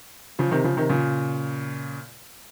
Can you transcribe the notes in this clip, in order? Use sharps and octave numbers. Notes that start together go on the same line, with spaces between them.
C#3 F3
C3 D#3
C#3 F3
C3 D#3
A#2 C#3